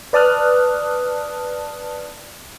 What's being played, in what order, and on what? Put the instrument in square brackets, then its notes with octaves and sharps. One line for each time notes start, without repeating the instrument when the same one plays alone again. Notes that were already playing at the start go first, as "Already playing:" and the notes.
[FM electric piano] B4 D5 A5 D#6 F6 F#6